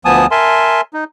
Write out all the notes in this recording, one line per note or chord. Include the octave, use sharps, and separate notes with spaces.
D2 F3 B3 G#5 A5 D#6
A#4 E5 G#5 A5 C6
D#4